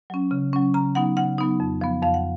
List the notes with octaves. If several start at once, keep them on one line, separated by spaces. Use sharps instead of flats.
F#3 C#4
C#3
F#3 C#4
C#3 A#5
F#3 B3 D#4 F#5
C#3 F#5
F#3 B3 D#4
F2
F3 B3
F2 F5
F#5